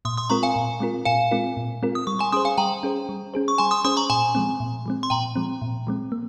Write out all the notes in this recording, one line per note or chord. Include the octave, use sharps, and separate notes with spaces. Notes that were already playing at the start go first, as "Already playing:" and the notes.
A#2 C6 D#6
C6 D#6
G#3 C4 F4 A#4 A#5 C#6
F5 G#5
A#2
G#3 C4 F4 A#4
A#2 F5 G#5
G#3 C4 F4 A#4
A#2
G#3 C4 F4 A#4
D#6
G3 C#6
G#5 C6
C#4 G#4 C5 C6 D#6
F5 G#5
G3 G5 A#5
C#4 G#4 C5
G3
C#4 G#4 C5
C#6
G3 G#5 C6
C6 D#6
C#4 G#4 C5 C6 D#6
A#5 C#6
A#2 G#5 C6
F3 G#3 C4
A#2
F3 G#3 C4
C6
A#2 G5 A#5
F3 G#3 C4
A#2
F3 G#3 C4
A#3